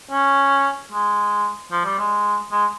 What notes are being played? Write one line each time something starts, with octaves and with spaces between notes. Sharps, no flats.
C#4
G#3
F3
G3
G#3
G#3